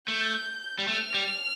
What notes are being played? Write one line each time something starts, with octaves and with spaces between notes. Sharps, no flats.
A3 G6
G3
A3 F6
G3